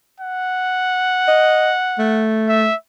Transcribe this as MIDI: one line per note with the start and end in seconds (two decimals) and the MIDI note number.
0.20 2.25 78
1.28 1.72 75
1.99 2.69 57
2.49 2.75 76